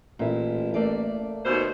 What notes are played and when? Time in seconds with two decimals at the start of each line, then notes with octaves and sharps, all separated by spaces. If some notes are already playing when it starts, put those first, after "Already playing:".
0.19 A1 A#2 E4
0.74 A3 A#3 D5
1.45 D#2 B2 C5